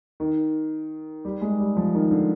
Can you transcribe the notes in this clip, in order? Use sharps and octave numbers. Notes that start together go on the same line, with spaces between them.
D#3
G3
G#3
G3
F3
D#3
D3